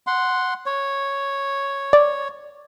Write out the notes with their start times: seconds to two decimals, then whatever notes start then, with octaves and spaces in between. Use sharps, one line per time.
0.07 F#5 C6
0.66 C#5
1.93 D5